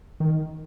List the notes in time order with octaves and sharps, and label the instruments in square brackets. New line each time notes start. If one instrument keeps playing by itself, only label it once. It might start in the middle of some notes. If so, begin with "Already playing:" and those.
[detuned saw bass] D#3